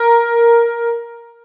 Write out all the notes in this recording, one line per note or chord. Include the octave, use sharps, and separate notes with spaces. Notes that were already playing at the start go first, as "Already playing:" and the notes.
Already playing: A#4